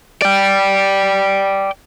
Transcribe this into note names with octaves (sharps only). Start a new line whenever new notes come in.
D5 G5